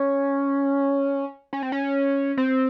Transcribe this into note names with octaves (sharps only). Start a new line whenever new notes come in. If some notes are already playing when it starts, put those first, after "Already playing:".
Already playing: C#4
C#4
C4
C#4
C4